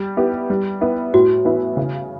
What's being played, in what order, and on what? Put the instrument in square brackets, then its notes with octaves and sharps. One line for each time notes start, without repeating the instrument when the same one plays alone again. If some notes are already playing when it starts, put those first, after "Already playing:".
Already playing: [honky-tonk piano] G3
B3 E4 G4
G3
B3 E4
[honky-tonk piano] A2 [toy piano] F#4
[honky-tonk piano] E3 B3 E4
C#3